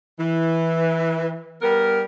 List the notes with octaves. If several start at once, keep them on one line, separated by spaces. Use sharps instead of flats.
E3
G3 B3 A#4